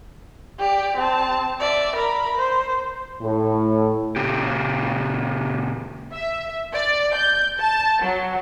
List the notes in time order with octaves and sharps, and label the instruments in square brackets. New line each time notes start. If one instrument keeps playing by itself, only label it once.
[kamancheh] G4 D5
C4 A5
D5 E5
A#4 B5
C5
[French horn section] A2
[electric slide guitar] A#2 C#3 G4
[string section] E5
D5
G6
A5
F#3